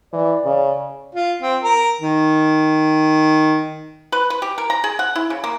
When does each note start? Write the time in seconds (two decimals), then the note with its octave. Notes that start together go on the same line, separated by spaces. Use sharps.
0.13 E3 D5
0.45 C#3
1.15 F4
1.42 C4
1.64 A#4
2.01 D#3
4.12 B4
4.30 B4
4.42 G4
4.58 A#4
4.70 A#5
4.84 G#4
4.99 F#5
5.16 E4
5.30 C#3
5.44 A#3